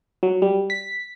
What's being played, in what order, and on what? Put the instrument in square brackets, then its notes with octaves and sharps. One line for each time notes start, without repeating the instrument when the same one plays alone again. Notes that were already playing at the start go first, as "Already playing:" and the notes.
[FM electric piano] F#3
G3
B6